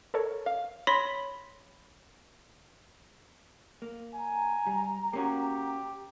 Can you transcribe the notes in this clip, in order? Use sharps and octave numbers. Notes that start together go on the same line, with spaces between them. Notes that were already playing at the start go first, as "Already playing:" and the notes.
A4 A#4 C#5
F5
C#5 B5 C6 A#6 B6
A#3
G#5 A#5
G3
A#3 C#4 F#4 G4